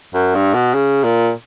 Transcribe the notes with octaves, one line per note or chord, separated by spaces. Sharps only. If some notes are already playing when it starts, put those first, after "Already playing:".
F#2
G2
B2
C#3
A#2